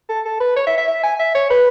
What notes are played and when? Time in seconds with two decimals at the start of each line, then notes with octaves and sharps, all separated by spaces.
0.09 A4
0.25 A4
0.40 B4
0.57 C#5
0.67 E5
0.78 E5
0.88 E5
1.03 G#5
1.19 E5
1.35 C#5
1.51 B4